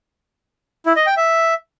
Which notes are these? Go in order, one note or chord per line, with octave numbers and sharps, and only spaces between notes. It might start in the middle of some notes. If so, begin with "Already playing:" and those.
E4
D#5
G5
E5